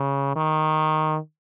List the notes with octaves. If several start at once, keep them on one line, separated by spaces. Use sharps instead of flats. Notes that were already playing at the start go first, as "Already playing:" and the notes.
Already playing: C#3
D#3